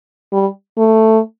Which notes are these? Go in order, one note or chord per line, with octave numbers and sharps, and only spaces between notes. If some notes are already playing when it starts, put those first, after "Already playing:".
G3
A3